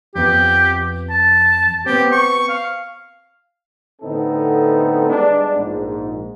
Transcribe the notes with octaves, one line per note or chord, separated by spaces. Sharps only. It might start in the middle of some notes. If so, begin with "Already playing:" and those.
F2 B3 G4
A5
B3 C4 G4
C#6
F5
A2 D3 B3 C4 D#4 A4
G3 G#3 B3 D4
A#1 G#2